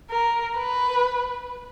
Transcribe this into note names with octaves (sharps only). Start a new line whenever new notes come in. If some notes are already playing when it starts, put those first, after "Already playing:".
A#4
B4